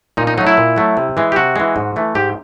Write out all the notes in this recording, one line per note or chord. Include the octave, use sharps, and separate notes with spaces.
A#2 D#4
D#4
F#3 A3 D#4
E4
A#2
F#3 A3
C3
E3 G#3
G4
C3 F#4
E3 G#3
G#2
E3 A3
G#2 G4